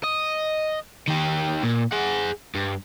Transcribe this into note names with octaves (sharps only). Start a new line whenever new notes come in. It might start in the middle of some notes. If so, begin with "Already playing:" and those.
D#5
D#3 G4
A#2
G#4 F#5
G2